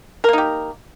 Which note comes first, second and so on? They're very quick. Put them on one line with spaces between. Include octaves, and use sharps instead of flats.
A#4 A#3 D#4 G4